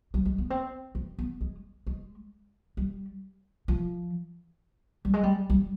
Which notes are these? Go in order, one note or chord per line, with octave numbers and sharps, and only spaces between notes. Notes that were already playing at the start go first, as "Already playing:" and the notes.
G3
G#3
B3
C4
C4
B3
G#3
G#3
G3
F3
G3
G#3
G3
G3